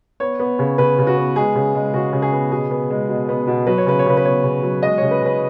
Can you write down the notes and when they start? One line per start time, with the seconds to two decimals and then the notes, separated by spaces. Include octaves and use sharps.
0.20 B3 C#5
0.39 B3
0.59 C#3
0.78 C#3 B4
0.98 C#3
1.07 F#4
1.17 B3
1.36 G#3 G#4
1.55 C#3
1.75 G#3
1.94 C#3 F#4
2.13 C#3
2.22 G#4
2.32 B3
2.52 B2 G#4
2.71 B3
2.90 G#3
3.09 B2
3.29 B3
3.48 B2
3.67 F#3 B4
3.78 C#5
3.86 C#3 B4
3.99 C#5
4.06 C#3 B4
4.17 B4
4.25 B3 C#5
4.44 C#3
4.63 F#3
4.82 G#3 D#5
4.98 C#3 C#5
5.11 B4
5.21 C#3 B4